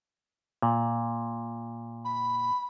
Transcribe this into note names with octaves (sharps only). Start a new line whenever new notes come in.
A#2
B5